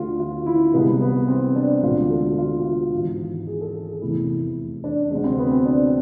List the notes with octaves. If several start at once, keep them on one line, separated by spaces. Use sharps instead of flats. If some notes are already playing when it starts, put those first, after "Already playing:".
Already playing: D2 D3 A3 F4
F4
E4
C2 C3 G#3 B3
B3
C4
D4
E1 D2 D3 F4
A4
F4
F4
G#1 G#2 E3
G#4
A4
A4
G#4
F1 E2 C3 E3 A3 E4
D4
D2 C3 G#3 D4
C4
B3
C4
D4